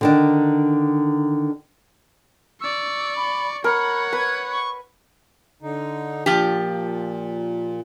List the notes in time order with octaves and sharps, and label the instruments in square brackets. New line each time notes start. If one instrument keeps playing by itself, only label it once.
[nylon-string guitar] D3 D#3 D4
[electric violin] D5 C#6 [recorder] E6
[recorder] B5
[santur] A#4 [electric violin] C#5 F#5 [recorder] B5
[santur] B4 [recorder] G#6
[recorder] C#6
[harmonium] D3 D#4
[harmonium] A#2 [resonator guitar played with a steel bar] F3 G4